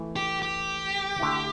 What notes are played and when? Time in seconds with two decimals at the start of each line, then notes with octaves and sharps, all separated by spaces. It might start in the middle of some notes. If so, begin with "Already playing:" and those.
Already playing: E3 A3 E4
0.16 G4
0.42 G4
1.20 D3 A3 E4